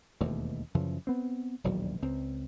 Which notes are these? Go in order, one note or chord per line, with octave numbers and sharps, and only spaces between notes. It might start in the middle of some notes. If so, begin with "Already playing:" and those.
E1 D#2 B2 A3
F#2 C#3 E3 F3
B3 C4
E1 A#1 D#2 F#3
C#2 C4